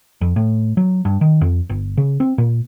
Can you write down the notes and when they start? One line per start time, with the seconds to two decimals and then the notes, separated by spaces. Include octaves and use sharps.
0.21 F2
0.36 A2
0.77 F#3
1.05 G2
1.21 D#3
1.41 F2
1.69 G1
1.97 C#3
2.20 C4
2.38 A#2